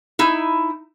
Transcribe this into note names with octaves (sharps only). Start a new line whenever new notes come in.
D#4 E4